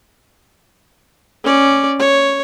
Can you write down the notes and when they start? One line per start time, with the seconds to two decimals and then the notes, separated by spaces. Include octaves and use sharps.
1.44 C#4 D5
1.99 C#5